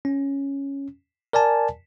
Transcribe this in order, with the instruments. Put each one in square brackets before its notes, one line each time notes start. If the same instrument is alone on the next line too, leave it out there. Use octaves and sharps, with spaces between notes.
[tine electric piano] C#4
A#4 D5 G#5 A5